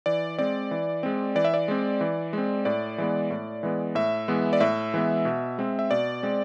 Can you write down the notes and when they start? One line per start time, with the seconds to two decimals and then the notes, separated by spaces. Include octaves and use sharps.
0.06 E3 D5
0.38 G#3 C4 D5
0.71 E3
1.03 G#3 C4
1.35 E3 D5
1.45 E5
1.54 D5
1.68 G#3 C4
2.01 E3
2.33 G#3 C4
2.65 A2 D5
2.98 E3 G#3 B3
3.31 A2
3.63 E3 G#3 B3
3.95 A2 E5
4.28 E3 G#3 B3
4.53 D5
4.61 A2 E5
4.94 E3 G#3 B3
5.25 B2
5.58 G#3 C4
5.79 E5
5.91 B2 D5
6.23 G#3 C4